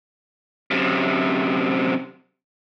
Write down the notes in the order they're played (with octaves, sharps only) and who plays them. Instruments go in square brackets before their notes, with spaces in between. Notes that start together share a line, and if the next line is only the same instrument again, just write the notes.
[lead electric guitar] F#2 C3